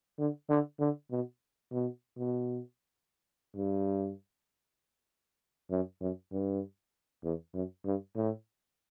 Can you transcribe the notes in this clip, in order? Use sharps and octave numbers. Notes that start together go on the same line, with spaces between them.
D3
D3
D3
B2
B2
B2
G2
F#2
F#2
G2
E2
F#2
G2
A2